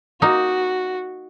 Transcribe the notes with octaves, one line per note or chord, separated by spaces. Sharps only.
A#3 D#4 F#4